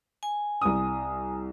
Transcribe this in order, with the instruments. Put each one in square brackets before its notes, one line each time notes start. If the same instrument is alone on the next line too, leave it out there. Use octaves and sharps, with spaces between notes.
[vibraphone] G#5
[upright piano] C2 D#6